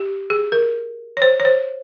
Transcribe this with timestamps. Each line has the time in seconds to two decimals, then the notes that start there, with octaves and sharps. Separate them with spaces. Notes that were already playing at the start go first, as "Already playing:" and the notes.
Already playing: G4
0.30 G#4
0.52 A#4
1.17 C#5
1.22 C5
1.40 C#5
1.45 C5